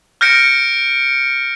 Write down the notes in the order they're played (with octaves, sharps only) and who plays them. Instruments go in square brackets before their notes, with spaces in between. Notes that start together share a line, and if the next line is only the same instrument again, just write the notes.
[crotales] F6 G6 A#6 C#7 D7